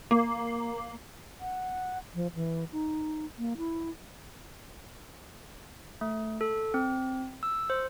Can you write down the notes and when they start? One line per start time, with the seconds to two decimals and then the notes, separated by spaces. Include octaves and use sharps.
0.11 A#3
1.40 F#5
2.15 F3
2.35 E3
2.72 D#4
3.38 A#3
3.57 E4
6.01 A3
6.41 A4
6.74 C4
7.43 E6
7.70 C5